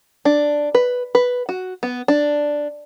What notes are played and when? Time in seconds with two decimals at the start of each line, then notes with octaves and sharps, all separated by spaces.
0.25 D4
0.75 B4
1.15 B4
1.49 F#4
1.83 B3
2.08 D4